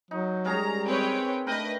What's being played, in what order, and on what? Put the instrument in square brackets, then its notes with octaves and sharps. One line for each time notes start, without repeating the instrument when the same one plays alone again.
[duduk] F#3 [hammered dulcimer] D#4
[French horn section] G3 G#3 [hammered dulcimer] C#4 G#4 A#4 [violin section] A#5
[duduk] C4 [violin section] B4 C#5 G5
[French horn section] A3 D4 [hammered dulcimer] A#4 G5 [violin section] B4 D#5